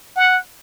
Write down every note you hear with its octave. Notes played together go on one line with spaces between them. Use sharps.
F#5